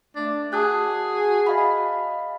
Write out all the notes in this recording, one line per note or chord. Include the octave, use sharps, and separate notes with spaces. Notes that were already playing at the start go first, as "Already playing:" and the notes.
A3 D4
F#4 G#4 A5 D#6 F#6
D#5 F5 B5